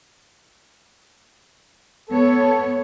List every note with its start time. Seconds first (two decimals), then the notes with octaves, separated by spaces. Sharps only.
2.10 B3 A4 C#5